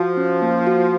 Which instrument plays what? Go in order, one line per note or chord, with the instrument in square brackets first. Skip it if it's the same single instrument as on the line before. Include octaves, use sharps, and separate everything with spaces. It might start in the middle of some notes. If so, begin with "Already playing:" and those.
Already playing: [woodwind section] F3 [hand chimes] F#4
[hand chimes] C#4
A#3
F#4